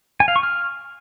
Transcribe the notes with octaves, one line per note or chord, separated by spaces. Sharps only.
G#5
F5
C#6
F6